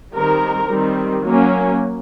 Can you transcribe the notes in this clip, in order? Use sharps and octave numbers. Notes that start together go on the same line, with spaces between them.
D#3 G3 C4 A#4
D#3 G3 C4
F#3 A#3 C#4